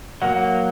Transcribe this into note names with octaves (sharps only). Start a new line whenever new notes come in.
F#3 A#3 F#5